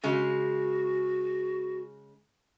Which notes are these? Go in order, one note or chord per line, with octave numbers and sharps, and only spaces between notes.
C#3 G#3 F#4